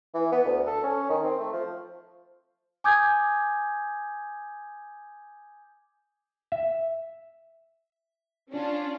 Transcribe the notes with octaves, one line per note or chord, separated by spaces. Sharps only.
E3
B3
D2
A4
C#4
D#3
C4
A3
F3
G#5 D6 D#6 G6 G#6
E5
C#4 D4 F4